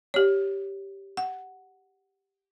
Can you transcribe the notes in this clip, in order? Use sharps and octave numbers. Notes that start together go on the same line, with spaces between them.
G4 C#5
F#5